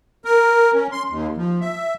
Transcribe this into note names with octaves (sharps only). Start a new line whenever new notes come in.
A#4
C#4
C6
D#2
F3
E5